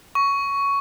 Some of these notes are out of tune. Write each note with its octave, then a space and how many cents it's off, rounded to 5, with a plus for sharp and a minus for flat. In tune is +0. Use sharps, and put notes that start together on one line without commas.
C#6 +10